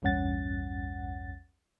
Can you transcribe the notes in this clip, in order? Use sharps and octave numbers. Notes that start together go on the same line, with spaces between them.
A#1 E2 G2 C#4 F#5 A6